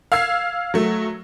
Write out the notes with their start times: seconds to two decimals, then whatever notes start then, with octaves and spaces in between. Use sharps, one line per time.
0.12 F5 E6 G#6 C7
0.74 F#3 A3